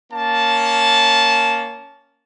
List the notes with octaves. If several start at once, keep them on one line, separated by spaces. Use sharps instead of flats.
A#3 C#4 A5